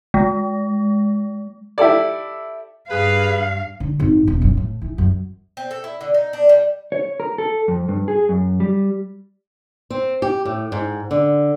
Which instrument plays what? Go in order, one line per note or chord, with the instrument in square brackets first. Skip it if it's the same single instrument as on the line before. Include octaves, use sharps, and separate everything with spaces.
[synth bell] G#3
[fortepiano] E4 G4 A4 D5
[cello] G2 F5 [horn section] G#4 B4
[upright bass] D3
G#1
E1
F#2
A2
E3
F#2
[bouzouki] C4
A4
E4
D3
D#4
D4
G3
[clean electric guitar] C#5
A#4
A4
F2
G2
G#4
F#2
G3
[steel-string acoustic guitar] C4
G4
A2
G#2
D3